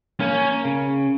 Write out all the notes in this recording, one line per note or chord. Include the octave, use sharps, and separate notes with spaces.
A#3 C#4
C#3